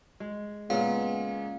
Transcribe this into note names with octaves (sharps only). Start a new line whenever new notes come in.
G#3
A#2 C#3 G#3 A#3 B3 F5